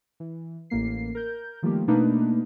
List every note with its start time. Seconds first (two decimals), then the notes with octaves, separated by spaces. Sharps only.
0.20 E3
0.70 A1 A2 A#3 C7
1.15 A#4 G6
1.62 D#3 F3 G3 A3 A#3 G4
1.88 B2 A3 A#3 D4 D#4 B4